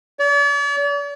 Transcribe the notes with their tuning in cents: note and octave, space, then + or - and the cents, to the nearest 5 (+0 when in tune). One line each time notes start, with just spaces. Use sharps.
D5 -45